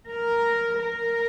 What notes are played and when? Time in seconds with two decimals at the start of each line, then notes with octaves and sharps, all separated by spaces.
0.09 A#4
0.79 A#4